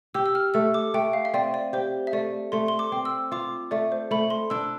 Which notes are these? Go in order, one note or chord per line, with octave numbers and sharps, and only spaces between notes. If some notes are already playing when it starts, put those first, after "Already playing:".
G4 E6
E6
F6
A3 E6
D6
A3 G5
F5
E5
C4 D5
D5
G4 C5
E5
A3 D5
A3 C6
C6
D6
C4
E6
F4 D6
A3 D5
C5
A3 B5
C6
D4 E6